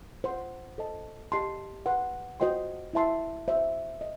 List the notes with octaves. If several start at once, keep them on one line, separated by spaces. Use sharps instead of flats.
C5 F#5 C6
A4 C5 D#5 A5
G4 D#5 A5 C6
B4 F#5 C6
F#4 C5 D#5 G5 C6
E4 B4 E5 A5 C6
F#4 C5 E5
D#5